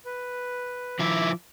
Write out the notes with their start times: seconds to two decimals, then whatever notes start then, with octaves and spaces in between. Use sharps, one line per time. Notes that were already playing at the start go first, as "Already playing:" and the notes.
0.05 B4
0.99 D#3 F3 E4 E5 D6